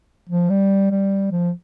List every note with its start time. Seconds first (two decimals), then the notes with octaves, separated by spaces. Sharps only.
0.29 F3
0.50 G3
0.91 G3
1.32 F3